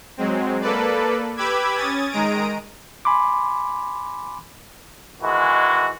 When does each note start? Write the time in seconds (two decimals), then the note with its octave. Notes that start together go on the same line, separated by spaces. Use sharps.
0.17 F#3 G#3 C4
0.61 A#3 A4 B4 D5
1.37 G4 B4 B5 D6 E6 G#6
1.76 C#4 D#6 G#6 A6
2.10 D#3 G#3 A#5 D#6 D7
3.05 G#5 B5 C6 D6
5.21 D#3 E3 G#3 F#4